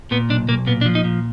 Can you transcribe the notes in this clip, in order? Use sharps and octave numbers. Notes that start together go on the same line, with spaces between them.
A#2 B3
B1 D4
B1 A#3
A#2 B3
D4
F3
D#4
A#2